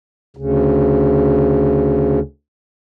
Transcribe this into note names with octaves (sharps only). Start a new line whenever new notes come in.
D2 C#3